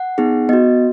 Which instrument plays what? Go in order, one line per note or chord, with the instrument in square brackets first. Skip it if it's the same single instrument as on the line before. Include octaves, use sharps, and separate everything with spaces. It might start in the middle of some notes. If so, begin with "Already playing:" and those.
Already playing: [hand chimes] F#5
B3 D#4 G#4
B3 F#4 D#5